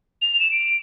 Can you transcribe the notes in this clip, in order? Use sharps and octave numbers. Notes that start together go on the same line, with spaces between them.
F7
E7
D7